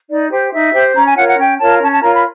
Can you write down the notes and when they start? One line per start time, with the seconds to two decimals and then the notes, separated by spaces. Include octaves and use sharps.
0.09 D#4 D5
0.30 G4 C5
0.52 D#4 E5
0.73 G4 C5
0.95 C#4 A#5
1.06 G#5
1.17 F4 A#4 C#5 F#5
1.27 F#5
1.38 C#4 G5
1.59 F4 A#4 C#5 A5
1.81 C#4 A5
1.91 A5
2.02 F4 A#4 C#5 A#5
2.13 B5